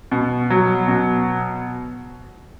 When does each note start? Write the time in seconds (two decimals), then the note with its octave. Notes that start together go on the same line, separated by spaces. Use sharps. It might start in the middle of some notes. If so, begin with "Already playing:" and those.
0.12 B2
0.50 F#3
0.88 B2